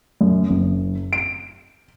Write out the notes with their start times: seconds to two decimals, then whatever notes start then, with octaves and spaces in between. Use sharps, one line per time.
0.21 F#2
0.50 F#1
1.13 D7